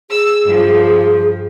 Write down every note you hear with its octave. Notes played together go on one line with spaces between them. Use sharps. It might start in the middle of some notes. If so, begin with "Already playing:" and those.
G#4 E6
G2 F3